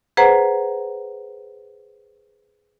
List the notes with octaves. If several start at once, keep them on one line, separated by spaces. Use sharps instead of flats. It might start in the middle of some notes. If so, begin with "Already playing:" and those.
G#4 B4 C5 F#5 A#5